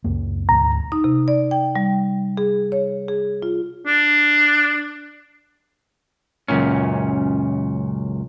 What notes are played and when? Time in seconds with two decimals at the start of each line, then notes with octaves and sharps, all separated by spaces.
0.04 C#2 F#2 A#3
0.49 D2 G#2 B2 A#5
0.92 D#4
1.04 C3
1.28 D5
1.51 G5
1.76 G3
2.37 G#4
2.72 C#5
3.08 G#4
3.42 F4
3.87 D4
6.48 C#2 F#2 A#2 C#4